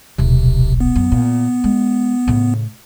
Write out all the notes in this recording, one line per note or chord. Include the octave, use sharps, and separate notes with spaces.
D#1 B1 C3
B3
F#2
A#2
G#3
A2 C#3